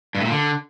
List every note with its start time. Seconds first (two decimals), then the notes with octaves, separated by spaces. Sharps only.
0.15 G2
0.20 A2
0.25 A#2
0.30 D3